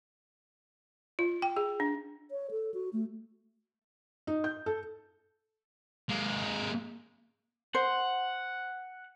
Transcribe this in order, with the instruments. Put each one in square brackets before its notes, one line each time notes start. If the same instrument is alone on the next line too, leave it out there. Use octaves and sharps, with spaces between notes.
[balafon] F4
G5
G#4
D4
[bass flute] C#5
A4
F#4
A3
[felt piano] D#4
G6
A4
[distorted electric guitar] G#3 A#3
[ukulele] C5 [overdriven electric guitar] F#5